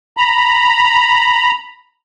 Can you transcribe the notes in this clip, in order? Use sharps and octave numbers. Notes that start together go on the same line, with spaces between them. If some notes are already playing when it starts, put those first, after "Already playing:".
A#5 B5